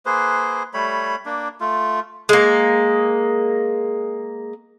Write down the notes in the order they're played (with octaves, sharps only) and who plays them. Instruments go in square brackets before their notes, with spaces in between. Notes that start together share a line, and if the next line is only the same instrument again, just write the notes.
[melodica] A#3 G#4 B4 C5
G3 A3 C#5 B5
A#3 D4
A3 F4
[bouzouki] G#3 A#3